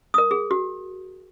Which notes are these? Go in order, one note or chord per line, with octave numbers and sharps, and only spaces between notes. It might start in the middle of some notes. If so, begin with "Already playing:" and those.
A#4 D#6
G#4
F#4